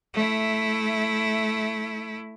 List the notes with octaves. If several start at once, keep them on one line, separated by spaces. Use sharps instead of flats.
A3 E4